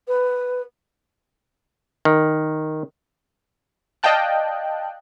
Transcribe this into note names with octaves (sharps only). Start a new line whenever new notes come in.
B4
D#3
D5 D#5 F5 G5 A5 F#6